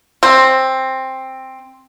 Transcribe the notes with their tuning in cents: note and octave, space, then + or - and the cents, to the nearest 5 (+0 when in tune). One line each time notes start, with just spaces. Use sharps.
C4 +10